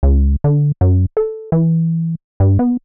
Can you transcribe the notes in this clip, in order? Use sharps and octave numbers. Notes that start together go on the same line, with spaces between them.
C#2
D3
F#2
A4
E3
G2
B3